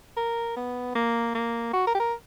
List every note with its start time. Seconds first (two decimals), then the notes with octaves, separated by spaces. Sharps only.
0.17 A#4
0.56 B3
0.95 A#3
1.35 A#3
1.73 F#4
1.87 A#4
1.95 G4
2.00 A#4